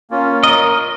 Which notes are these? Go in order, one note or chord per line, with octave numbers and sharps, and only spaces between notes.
A#3 C#4 F4
A#4 D#5